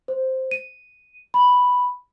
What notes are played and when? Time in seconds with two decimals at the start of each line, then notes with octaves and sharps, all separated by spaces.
0.08 C5
0.51 D#7
1.34 B5